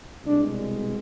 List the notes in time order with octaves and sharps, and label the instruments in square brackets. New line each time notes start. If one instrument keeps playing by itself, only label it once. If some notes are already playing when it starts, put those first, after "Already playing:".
[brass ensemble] C2 B2 G#3 D4